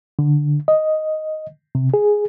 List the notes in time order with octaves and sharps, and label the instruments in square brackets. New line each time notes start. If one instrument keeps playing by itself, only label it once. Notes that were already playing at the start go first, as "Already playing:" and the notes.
[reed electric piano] D3
D#5
C3
G#4